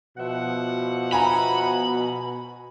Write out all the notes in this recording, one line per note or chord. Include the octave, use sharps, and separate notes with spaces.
B2 F3 E5 F#5
G#5 A#5 B5